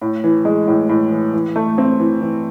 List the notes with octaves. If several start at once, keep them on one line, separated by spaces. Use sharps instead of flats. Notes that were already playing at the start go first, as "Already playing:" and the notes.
A2
E3
G#3
A2
A2
E3
E3
A3
C4
E3
E3